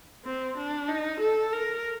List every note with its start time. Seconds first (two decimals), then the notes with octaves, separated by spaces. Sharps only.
0.25 C4
0.57 D4
0.88 D#4
1.20 A4
1.52 A#4